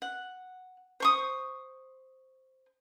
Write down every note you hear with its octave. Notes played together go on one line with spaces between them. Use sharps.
F#5
C5 C#6 D#6